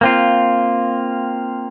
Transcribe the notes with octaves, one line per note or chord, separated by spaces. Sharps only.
A#3 C4 F4